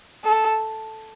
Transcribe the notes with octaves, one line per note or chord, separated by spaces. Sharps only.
A4